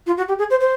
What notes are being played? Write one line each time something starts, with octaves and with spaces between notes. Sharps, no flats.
F4
F#4
G4
G#4
C5
C5